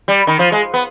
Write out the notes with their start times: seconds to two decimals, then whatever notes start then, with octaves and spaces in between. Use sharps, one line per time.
0.08 G3
0.27 D#3
0.39 F3
0.52 G#3
0.74 B3